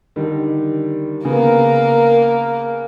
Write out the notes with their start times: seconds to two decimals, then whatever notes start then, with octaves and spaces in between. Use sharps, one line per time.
0.16 D3 D#3 G3
1.25 C#3 A#3 B3 A#4